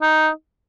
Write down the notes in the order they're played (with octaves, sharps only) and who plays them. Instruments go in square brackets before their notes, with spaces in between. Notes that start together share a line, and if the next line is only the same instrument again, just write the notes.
[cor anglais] D#4